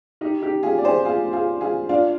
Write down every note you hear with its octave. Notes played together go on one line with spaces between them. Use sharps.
D#4 G4
D#4 G4
F4 G#4
D5
G#4 C5
F4 G#4
F4 G#4
F4 G#4
D4 F4